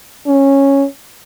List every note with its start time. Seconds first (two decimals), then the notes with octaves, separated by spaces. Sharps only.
0.27 C#4